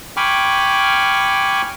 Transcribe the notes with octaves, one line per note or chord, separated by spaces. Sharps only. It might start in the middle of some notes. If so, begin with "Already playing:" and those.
G5 G#5 B5 C#6 D6 F6